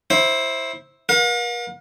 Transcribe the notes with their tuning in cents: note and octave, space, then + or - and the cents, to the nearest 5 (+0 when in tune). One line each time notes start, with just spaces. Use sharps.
E4 -10 C5 +15
A#4 +45 F5 +45